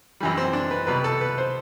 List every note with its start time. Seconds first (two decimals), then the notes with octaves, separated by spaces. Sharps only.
0.20 F#2 E3 G3
0.37 C4
0.53 D4
0.71 B4
0.87 C2 B2 G3 B4
1.04 A4
1.21 B4
1.38 C5